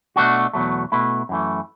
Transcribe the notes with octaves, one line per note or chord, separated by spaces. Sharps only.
B2 A3 D4 F#4
E2 B2 F#3 A3
B2 A3 E4 B4
F#2 E3 A3